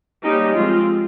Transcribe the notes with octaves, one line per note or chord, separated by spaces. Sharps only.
G3 A#3 C#4 D#4 G4
F3 G#3 C4 F4